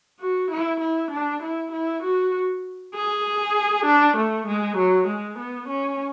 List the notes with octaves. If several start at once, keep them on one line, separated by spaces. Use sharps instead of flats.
F#4
E4
E4
D4
E4
E4
F#4
G#4
D4
A3
G#3
F#3
G#3
B3
C#4